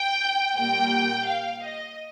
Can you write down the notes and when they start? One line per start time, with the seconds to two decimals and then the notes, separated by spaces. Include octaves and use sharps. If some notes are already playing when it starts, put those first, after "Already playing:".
Already playing: G5
0.56 A#2 G3 A#3 G5
1.28 F5
1.64 D#5